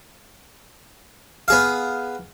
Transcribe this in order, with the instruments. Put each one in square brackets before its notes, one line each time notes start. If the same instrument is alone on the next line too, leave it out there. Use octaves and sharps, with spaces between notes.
[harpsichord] B3 G#4 F5